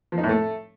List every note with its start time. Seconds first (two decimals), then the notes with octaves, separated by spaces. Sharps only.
0.12 F3
0.18 D#4
0.23 A2
0.29 A3